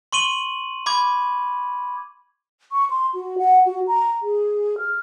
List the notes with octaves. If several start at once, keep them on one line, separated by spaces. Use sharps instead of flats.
C6 C#6 D#7 F#7
B5 D6 G#6
C#6
C6
F#4
F#5
F#4
A#5
G#4
F6